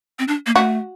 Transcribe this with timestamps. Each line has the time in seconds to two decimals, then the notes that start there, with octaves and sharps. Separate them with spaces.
0.19 C4
0.28 D4
0.46 A#3
0.56 A3 F#4